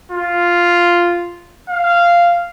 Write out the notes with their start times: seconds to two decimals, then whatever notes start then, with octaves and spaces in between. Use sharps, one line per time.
0.12 F4
1.69 F5